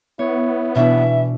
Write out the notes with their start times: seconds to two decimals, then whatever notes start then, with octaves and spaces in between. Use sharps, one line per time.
0.19 B3 E4 C#5
0.75 B2 E3 D4 E4 E5